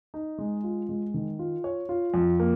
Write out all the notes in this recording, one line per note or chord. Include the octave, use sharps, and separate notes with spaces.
D#4
G#3
F4
G#3
D#3
F4
C#5
F4
F2
A#3